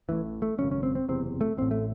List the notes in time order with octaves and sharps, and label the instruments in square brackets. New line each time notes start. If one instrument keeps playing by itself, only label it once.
[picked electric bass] A1 A2 E3
A3
G#1 F#2 C#3 C#4
C#4
C4
C4
F#1 E2 C3 C4
A3
A1 A2 C4
A3